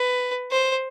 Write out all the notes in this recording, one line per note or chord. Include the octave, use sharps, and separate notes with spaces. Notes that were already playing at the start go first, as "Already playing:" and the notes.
Already playing: B4
C5